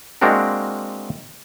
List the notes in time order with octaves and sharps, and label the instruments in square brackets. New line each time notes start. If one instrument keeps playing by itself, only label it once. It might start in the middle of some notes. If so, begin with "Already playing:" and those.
[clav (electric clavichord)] G#3 A#3 C4 D4 F#4 A#4